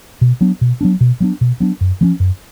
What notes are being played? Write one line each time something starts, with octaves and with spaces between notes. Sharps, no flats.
B2
F#3 B3 D4
B2
F#3 B3 D4
B2
F#3 B3 D4
B2
F#3 B3 D4
F#2
F3 A3 C#4
F#2